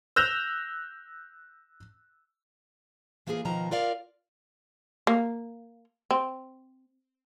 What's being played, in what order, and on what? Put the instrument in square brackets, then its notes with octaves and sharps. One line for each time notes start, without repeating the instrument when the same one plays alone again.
[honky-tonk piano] E6 F#6 G6 A#6 E7 F7
[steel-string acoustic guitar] E3 A#3 F4 G4 G#4
B2 D#3 F3 A#5
F4 A#4 D5 F5
[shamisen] A#3
C4